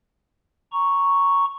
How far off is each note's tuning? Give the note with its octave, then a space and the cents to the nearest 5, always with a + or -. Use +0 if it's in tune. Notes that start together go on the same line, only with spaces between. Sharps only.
A#5 +0 C#6 +0